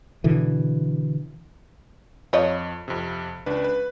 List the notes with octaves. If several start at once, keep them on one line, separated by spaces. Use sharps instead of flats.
B2 D3 E3
F2 F3 C#5 D#5
F2 C3
C#2 D4 B4
B4